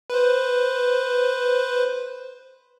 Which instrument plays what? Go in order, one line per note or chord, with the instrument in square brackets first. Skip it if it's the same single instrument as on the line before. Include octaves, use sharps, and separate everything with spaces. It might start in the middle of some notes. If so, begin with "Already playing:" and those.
[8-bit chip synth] B4 C5